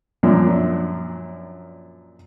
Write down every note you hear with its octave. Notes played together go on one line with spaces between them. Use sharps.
F#2 A#2 F3 D4